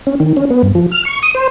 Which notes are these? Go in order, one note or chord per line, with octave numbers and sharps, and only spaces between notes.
C#4
D#3
C#4
B3
G2
F3
F6
C#6
D#6
C5